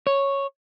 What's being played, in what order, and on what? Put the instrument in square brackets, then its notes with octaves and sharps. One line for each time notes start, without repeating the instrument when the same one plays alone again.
[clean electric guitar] C#5